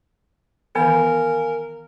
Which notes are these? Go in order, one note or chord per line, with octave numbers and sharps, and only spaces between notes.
D#3 E3 B3 A#4 F5 G#5